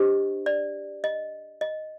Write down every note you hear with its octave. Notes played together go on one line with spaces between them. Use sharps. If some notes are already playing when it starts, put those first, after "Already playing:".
Already playing: D4 G4 C5 D#5
D5
D#5
D#5